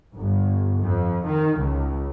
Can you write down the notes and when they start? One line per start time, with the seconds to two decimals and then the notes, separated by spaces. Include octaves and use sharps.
0.16 G1
0.81 F2
1.26 D#3
1.57 C#2